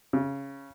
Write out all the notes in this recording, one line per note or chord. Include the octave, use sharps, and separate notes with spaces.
C#3